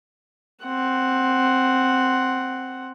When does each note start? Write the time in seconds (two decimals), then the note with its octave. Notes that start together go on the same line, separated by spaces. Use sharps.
0.65 C4 F#5